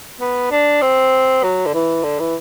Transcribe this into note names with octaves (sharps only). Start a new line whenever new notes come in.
B3
D4
C4
F#3
D3
E3
D3
E3